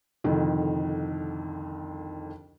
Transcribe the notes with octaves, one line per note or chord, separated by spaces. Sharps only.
C2 F2 D3 D#3